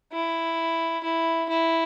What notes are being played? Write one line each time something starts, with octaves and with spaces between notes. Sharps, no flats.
E4
E4
E4